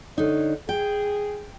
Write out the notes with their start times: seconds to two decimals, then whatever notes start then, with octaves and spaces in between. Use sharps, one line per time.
0.18 D3 D#4 C#5
0.69 G#4 G5